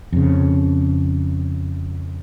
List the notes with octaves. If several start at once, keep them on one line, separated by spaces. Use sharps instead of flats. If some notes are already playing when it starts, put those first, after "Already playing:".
F2 C#3